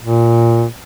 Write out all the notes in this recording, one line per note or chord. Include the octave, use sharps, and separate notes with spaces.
A#2